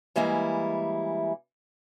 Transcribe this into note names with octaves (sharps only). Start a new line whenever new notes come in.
E3 G3 G#3 A#3 E4